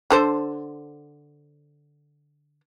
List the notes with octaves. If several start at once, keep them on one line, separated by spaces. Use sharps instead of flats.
D3 A4 C5